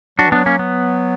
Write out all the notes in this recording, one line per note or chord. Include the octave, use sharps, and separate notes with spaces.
F#3 D4 F#4
E3
F#3 B3 D4
A#3 C#4
B3